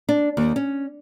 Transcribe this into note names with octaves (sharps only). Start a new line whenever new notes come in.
D4
D#2
C#4